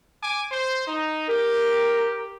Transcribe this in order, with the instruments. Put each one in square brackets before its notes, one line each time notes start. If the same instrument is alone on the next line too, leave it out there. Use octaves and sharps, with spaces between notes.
[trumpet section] G#5 D6
C5
D#4
[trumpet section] G4 [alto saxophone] A#4